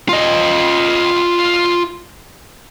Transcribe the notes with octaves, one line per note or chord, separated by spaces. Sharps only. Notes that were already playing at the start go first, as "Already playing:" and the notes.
F4 D#5